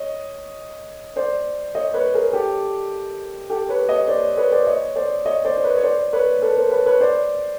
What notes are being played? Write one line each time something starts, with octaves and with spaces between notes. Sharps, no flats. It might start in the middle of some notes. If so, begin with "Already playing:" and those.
Already playing: C#5 D#5
C5 D5
C#5 D#5
B4 C#5
G#4 A#4
G4 A4
G4 A4
B4 C#5
C#5 D#5
C5 D5
B4 C#5
C5 D5
C#5 D#5
C5 D5
C#5 D#5
C5 D5
C5
B4 C#5
C#5
C5 D5
B4 C#5
A4 B4
A#4 C5
B4 C#5
B4 C#5
C5 D5